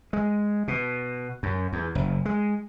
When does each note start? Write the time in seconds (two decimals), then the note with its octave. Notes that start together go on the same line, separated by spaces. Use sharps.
0.13 G#3
0.68 B2
1.43 F#2
1.73 E2
1.95 F#1
2.25 G#3